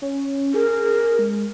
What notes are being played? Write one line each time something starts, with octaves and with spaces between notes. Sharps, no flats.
C#4
G#4 A#4
G#3